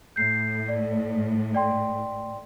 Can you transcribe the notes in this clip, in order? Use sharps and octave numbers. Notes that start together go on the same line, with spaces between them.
A2 G6 C7
D5
D5 G5 C6